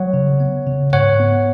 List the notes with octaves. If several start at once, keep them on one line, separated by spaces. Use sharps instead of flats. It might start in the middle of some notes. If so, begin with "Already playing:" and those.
Already playing: F#3 C#5 F#5
C#3
B3
C#3
G#2 C#5 F#5
B3